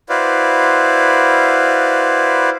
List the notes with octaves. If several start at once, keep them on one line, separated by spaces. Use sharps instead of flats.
E4 F#4 B4 C5 D5 F5